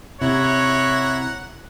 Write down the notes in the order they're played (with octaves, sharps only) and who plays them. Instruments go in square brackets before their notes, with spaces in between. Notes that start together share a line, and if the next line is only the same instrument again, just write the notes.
[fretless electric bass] C3 [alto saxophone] E4 [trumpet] C#5 [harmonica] F#5 A#5